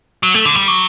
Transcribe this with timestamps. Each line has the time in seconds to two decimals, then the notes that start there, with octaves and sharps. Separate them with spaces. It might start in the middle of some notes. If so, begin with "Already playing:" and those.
0.23 F#3
0.34 A3
0.46 D3
0.56 G3
0.68 F#3